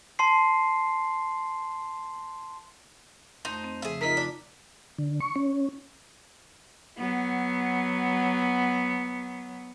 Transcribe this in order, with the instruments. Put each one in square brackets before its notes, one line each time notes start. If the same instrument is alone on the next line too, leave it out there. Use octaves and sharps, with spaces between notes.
[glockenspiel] A5 C6 C7
[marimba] F2 A3 [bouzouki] D#4 [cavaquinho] C5
[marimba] C4
[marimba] C#3 F3 [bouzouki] G#4 E5
[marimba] D#4 F4 [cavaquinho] A#4 D#5 [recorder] B6
[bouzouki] D4
[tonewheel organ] D3
C#6
C#4
[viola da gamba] F#3 B3